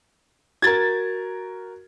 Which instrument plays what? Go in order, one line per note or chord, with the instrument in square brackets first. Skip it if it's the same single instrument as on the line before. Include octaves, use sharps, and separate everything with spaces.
[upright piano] F#4 A#4 [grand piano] G#6 A6